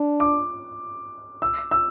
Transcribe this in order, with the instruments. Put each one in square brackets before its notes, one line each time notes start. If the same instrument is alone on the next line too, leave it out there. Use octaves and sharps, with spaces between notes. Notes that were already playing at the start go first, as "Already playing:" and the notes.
Already playing: [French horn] D4
[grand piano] D6
E6
E6